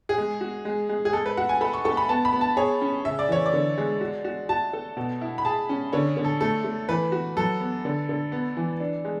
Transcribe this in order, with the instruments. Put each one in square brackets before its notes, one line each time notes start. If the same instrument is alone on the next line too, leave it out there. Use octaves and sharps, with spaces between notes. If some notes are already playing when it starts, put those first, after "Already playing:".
[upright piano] G#4
[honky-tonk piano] G#3
F#4
G#3
G#3
[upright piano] G#4
[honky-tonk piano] G#3 [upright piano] A4
[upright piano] B4
[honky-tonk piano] F#4 [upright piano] F#5
[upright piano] G#5
[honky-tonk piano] A4 [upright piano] B5
[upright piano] C#6
[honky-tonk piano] A4 [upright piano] C#6
[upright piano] B5
[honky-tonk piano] B3 [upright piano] A5
[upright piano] B5
[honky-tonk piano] B3
[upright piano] A5
[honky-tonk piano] G#4 [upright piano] C#5
[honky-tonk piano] C#4
[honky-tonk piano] C#3 [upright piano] E5
[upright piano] D5
[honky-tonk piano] E3 [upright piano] C#5
[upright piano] D5
[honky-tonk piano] D3
G#3
F#4
F#4
[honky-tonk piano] F#4 [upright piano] A5
[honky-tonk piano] A4
B2
E4
[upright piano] B5
[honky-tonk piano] G#4 [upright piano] A5
[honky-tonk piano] C#4
[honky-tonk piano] D3 [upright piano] C#5
[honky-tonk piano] D3
[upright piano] A4
[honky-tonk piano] A3 [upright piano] A4
[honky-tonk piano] A3
[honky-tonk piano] E3 [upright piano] B4
[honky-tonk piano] F#4
[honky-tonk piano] F#3 [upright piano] A4
[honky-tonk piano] B3
D3
D3
B3
E3
D4
G#3